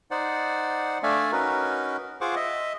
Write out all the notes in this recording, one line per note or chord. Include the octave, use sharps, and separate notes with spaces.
D#4 C5 D5 F#5
A3 D4 D5 E5 F5 G#5
C#4 D#4 F#4 A#4 B4
F4 G#4 C5 F#5 C#6 D6
D#5 E5